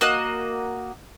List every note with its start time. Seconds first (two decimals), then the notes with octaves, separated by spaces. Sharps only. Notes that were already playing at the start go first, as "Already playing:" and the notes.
0.01 A#3 F#4 D#5 F#6